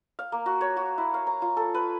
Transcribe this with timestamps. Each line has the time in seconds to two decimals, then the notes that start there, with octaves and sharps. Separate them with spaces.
0.19 F5
0.32 A#3
0.46 F#4
0.61 C#5
0.77 F#4
0.98 E4
1.14 F5
1.27 A#5
1.42 F4
1.57 A4
1.74 B4